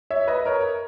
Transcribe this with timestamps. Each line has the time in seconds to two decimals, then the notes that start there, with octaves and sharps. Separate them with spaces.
0.10 C#5 E5
0.28 B4 D#5
0.46 A#4 C#5